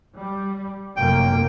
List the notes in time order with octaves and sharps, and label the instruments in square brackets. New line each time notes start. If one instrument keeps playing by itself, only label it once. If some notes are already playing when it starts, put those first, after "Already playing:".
[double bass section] G3
[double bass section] F1 F#2 A#3 [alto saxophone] G5